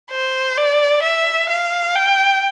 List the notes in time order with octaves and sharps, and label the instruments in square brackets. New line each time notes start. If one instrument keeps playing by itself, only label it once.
[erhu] C5
D5
E5
F5
G5